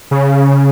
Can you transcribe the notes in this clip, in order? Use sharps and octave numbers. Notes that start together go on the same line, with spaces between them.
C#3